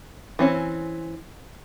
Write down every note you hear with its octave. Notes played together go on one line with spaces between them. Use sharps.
E3 C4 C#4